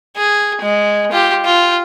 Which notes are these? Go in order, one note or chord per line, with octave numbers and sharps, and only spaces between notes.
G#4
G#3
F4 G4
F4